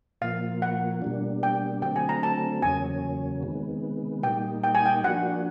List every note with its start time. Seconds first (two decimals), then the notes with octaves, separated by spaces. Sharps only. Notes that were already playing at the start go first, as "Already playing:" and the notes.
0.21 A#2 F3 A#3 F5
0.62 F#5
1.02 B2 G3 A#3 D4
1.43 G5
1.82 D3 F#3 A3 C4 G5
1.96 G#5
2.09 A#5
2.23 A5
2.62 E2 C#3 F#3 A#3 C#4 G#5
3.43 C3 D#3 G#3 B3
4.23 A#2 G3 A#3 D#4 G5
4.64 G5
4.75 G#5
4.86 G5
5.04 F3 A#3 D4 F#4 F#5